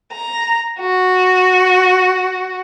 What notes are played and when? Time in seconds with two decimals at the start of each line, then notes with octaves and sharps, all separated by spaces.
0.12 A#5
0.80 F#4